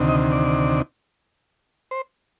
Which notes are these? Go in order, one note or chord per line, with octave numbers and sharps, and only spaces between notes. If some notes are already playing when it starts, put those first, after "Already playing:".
Already playing: D2 C3 D#3
D#5
D5
C5